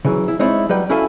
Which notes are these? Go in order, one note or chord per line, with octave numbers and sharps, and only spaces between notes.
C#3 E3 F#3
E4
G#3 C4 D#4 E4 C#5 D5
F#3 G3 B4 G5
C#4 E4 F#4 A4 F5 G#5